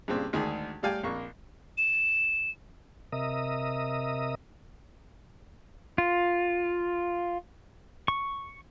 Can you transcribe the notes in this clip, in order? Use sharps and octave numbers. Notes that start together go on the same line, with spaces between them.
G2 A#2 C#3 C4 G4
D2 D#3 G#3 D4 G#4
A2 G3 D5 F5 G5 G#5
A#1 F2 A#3 C#6
E7
C3 A#4 D#5 E5 D#6
F4
C#6